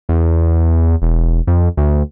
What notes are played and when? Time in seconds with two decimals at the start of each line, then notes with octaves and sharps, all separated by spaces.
0.09 E2
1.02 E1
1.47 F2
1.77 D2